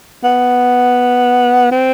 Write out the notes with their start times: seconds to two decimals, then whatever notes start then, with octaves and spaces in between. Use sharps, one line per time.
0.24 B3
1.72 C4